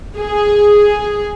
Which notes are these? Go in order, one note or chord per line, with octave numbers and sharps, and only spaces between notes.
G#4